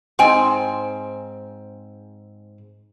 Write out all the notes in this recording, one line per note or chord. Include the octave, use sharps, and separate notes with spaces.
G#2 C4 G5 G#5